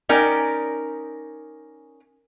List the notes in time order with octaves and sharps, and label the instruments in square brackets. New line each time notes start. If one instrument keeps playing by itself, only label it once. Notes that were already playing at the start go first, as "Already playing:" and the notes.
[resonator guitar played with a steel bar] C#4 D#4 A#4 D5 G5